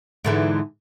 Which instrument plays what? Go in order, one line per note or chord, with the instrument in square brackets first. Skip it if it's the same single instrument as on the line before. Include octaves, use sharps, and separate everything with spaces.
[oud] G#2 D3 E3